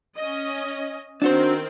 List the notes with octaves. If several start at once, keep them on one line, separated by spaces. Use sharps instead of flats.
C#4 D#5
D#3 C4 D4 F#4 C5